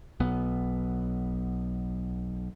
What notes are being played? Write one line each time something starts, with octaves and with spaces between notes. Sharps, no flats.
B1 B3